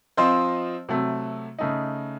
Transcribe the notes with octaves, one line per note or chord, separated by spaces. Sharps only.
F3 C4 F4 C5 D#5
C3 F#3 A3
C#3 A3 D#4